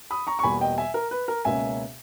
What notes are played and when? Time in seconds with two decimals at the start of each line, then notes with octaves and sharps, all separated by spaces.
0.11 B5 D#6
0.27 A#5 C#6
0.39 C#6
0.43 E2 B2 G3 A#3 G#5 B5
0.61 D#5 G5
0.78 E5 G#5
0.94 A#4
1.11 B4
1.28 A#4
1.45 C#2 B2 A#3 C#4 E5 G#5